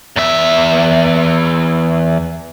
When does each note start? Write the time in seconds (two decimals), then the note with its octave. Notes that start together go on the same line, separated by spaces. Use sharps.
0.16 E2 E5